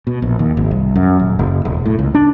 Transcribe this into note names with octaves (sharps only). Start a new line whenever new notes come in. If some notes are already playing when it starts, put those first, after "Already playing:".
B2
A#1
D#2
G#1
C2
F#2
D#1
F#1
E1
A2
C#2
D4